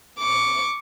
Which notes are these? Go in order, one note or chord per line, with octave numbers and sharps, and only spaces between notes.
C#6 D6